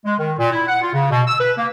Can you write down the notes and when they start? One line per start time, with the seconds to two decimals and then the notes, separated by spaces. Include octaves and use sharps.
0.05 G#3
0.19 D#3
0.38 A#2
0.52 E4
0.68 F#5
0.81 F4
0.93 C#3
1.11 B2
1.27 E6
1.40 B4
1.58 A#3